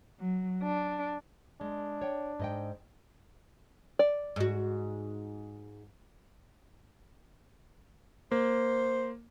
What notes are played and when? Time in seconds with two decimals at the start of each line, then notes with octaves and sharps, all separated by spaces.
0.19 F#3
0.62 D4
1.61 G#3 D4
2.02 C#5 G5
2.40 G#2 D#5 G5
3.99 D5
4.36 G#2 F#4
8.31 A#3 C5